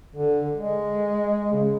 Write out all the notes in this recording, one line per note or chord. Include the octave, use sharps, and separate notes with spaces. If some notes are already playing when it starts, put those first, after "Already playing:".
D3
G#3
C#3